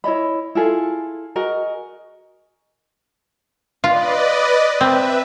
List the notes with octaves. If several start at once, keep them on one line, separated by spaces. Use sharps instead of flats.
E4 C#5 D#5 B5
E4 F4 G#4 A4
F#4 G#4 A#4 D#5
F4 B4 D5 D#5
C4 B4 E5